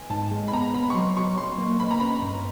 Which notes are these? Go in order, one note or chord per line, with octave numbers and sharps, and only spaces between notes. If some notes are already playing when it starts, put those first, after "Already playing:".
Already playing: G#5
G#2 A5
G#3
B5
B3 A#5
B3 B5
C#6
F#3 C6
F#3 C#6
F#3 C6
A#3
A#3 B5
A#5
C#4 B5
G2